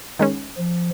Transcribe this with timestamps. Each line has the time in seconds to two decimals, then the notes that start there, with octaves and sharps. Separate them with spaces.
0.19 D#3 G#3 C#4
0.58 F3